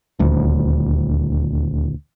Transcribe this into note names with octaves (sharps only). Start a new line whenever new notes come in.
D#1 D2